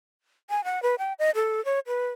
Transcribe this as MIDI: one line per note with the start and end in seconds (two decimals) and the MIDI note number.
0.50 0.64 80
0.64 0.82 78
0.83 0.95 71
0.99 1.13 79
1.19 1.31 75
1.35 1.63 69
1.65 1.79 73
1.87 2.08 71